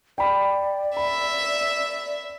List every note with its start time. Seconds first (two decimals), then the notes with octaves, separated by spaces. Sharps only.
0.18 D5 G5 B5
0.97 E5 B5